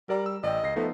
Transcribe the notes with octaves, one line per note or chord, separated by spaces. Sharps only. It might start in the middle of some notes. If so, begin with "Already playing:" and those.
G3 A#4 D5 A#5
E6
A1 D5 D#5 G5
C#2 A#6 C7
F3 A3 B3 D#4